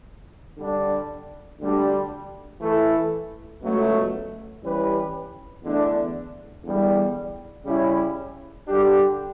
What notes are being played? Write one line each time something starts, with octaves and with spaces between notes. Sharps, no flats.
D3 G3 D4
D2 D3 G3 D4
E3 A3 E4 A4
C#2 B2 F#3 A3
E3 G3 C#4 G4 B4
E2 D3 A3 D4
E2 D3 G3
C#3 G3 C#4 E4
D3 G3 D4 G4